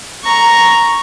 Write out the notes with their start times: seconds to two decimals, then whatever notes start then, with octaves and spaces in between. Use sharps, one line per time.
0.24 A#5 C#6